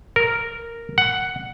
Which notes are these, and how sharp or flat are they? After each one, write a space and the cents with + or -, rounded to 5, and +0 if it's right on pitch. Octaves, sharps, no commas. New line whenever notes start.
A#4 -5
F#5 +5